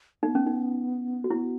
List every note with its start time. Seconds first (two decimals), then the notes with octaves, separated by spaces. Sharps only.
0.23 B3 D#4
0.35 C#4
0.47 D#4
1.24 F#4
1.30 B3 E4